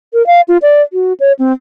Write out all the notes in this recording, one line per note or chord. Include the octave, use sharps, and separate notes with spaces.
A#4
F5
F4
D5
F#4
C#5
C4